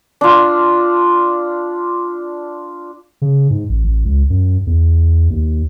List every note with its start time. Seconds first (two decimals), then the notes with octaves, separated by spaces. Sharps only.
0.21 D4 F4
3.22 C#3
3.50 G#2
3.69 A1
3.84 A1
4.05 C#2
4.30 F#2
4.67 E2
5.30 D#2